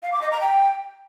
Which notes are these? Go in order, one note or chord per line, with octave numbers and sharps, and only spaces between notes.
F5
D6
D#5
A#5
G5